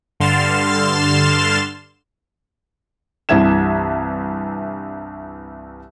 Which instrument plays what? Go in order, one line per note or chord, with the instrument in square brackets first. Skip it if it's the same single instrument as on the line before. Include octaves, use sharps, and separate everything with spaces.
[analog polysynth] G2 D3 C6 F6 A6 E7
[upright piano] C2 G2 E3 E5 G#6 E7